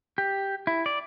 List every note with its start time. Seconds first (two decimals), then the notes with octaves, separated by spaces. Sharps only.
0.18 G4
0.67 E4
0.86 D5